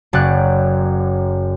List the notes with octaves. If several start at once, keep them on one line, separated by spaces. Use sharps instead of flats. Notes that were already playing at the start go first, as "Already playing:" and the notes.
F#1 F#2 D5 F#6